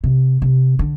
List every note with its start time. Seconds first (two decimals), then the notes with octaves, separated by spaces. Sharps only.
0.04 C3
0.42 C3
0.79 D3